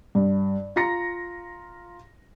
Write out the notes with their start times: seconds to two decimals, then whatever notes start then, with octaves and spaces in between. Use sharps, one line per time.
0.15 G2
0.76 F4 A#5 A#6 C#7